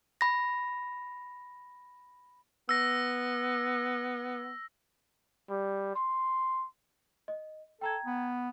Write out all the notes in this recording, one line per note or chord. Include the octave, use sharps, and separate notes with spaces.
B5 A#6
B3 E6 A#6
G3
C6
D#5
A4 G5 A#5 G#6
B3